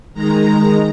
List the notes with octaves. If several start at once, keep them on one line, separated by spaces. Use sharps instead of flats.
D#3 G#3 A#5